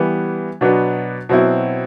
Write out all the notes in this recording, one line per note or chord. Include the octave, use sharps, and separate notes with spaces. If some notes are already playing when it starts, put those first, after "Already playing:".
Already playing: E3 G3 B3
B2 F#3 B3 D4
B2 F#3 C4 E4